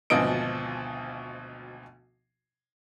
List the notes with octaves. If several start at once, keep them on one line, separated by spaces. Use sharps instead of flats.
G#1 D2 B2 F3 D#5 D7